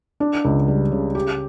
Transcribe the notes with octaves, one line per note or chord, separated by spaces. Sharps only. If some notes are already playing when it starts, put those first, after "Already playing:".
D4
C#2
G3
C#3
G4